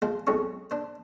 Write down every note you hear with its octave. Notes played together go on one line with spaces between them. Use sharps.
F3 G#3 C5
B1 F2 G#3 C#5 C#6
D4 C5